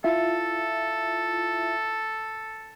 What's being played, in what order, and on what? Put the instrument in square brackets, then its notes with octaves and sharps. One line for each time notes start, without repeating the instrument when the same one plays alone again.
[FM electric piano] E4 F4 E5 [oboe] A4